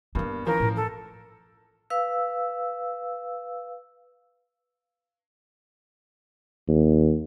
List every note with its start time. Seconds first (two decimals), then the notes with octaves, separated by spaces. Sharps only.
0.15 G2 A#3 B3 D4
0.45 E3 F3 C#4 A#4
0.60 A2
0.76 A4
1.90 B4 F5 E6
6.68 D#2